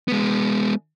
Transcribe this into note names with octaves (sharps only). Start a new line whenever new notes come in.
G#3 B3